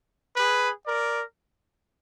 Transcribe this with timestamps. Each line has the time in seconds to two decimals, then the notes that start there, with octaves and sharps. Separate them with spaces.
0.36 G#4 B4
0.87 A#4 D5